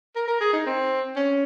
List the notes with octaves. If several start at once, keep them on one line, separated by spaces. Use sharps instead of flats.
A#4
A#4
G#4
D#4
C4
C#4